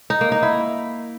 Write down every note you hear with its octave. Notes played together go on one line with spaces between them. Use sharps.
D#4
A#3
D#4
E4